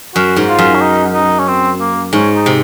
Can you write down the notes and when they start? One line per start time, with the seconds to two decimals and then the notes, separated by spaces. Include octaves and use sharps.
0.15 F#2 F#4
0.36 G#2
0.49 F4
0.58 F#2
0.75 C#4
0.81 D#4
1.13 D#4
1.39 C#4
1.48 C4
1.80 A#3
2.13 G#2 C#4
2.36 D#4
2.46 C3